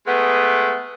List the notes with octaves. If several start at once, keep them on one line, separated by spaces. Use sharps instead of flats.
G#3 A3 B3